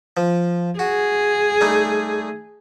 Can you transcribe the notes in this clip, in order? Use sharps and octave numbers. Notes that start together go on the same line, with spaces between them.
F3
F#4 G#4
G3 A3 D#4